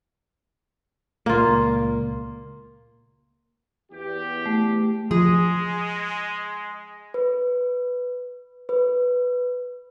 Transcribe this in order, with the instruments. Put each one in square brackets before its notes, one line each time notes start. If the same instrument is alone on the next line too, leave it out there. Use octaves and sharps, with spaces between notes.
[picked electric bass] C#2 A#2 [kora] A#3 F4
[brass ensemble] E2 G4
[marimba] A3
[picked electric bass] F3 [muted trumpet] G#3 [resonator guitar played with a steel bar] G#4
[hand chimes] B4
B4